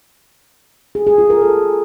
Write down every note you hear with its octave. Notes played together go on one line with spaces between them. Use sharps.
G#4
G#4
F4
A#4
A4